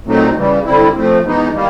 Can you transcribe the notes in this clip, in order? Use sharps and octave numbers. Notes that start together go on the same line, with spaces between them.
A#2 F#3 A3 C4 D#4
C#3 E3 G3
D3 G3 C4 E4
F3 A3 C4
E3 G#3 B3 D#4
D#3 G3 A#3